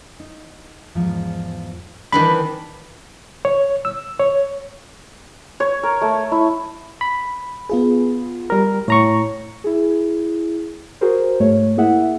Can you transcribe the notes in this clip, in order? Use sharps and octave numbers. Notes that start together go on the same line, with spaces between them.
D#4
E2 G#2 F3
D#3 E3 G3 C4 D4 B5
C#5
E6
C#5
C#5
A#4
A3
E4
B5
B3 F4 G#4
G3 A#4
A2 C#5 A#5 C#6
E4 G#4
F#4 G#4 A#4 C5
G#2 A3 C#5
A#3 E4 G#4 E5 F#5